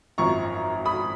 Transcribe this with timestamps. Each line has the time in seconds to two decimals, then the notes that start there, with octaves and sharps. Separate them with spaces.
0.18 G#1 F#2 F3 A#5 C#6
0.86 B5 D#6